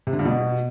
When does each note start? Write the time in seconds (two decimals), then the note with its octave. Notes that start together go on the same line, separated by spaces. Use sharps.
0.07 C3
0.13 D3
0.19 G2
0.25 B2